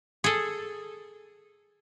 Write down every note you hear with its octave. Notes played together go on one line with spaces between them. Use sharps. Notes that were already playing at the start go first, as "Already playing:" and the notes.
G#4 A4